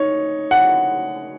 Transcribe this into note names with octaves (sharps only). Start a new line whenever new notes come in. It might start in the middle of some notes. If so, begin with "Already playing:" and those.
Already playing: D#4 C#5
F#5